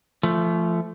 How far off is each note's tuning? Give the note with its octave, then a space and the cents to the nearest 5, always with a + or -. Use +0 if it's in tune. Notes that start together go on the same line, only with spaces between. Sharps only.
F3 -25 A3 +0